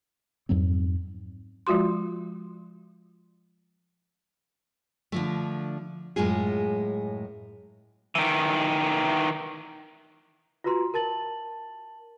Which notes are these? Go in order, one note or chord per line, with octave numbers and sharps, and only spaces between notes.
F2 G#2 F#3 C4
F3 G#3 F4 F#4 C6
D3 F3 A3
F#2 A2 G#3 F4 G#4
D#3 E3
F4 F#4 B4 A#5 C6
A#4 A5 A6 F#7